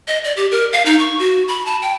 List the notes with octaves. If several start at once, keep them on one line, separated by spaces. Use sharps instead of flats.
D#5
D5
G4
A#4
F5
D#4
C#6
F#4
B5
A5
G5